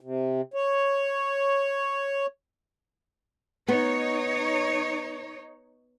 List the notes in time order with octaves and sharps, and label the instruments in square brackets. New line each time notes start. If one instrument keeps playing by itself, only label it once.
[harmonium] C3
C#5
[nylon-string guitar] B3 [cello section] D#4 C#5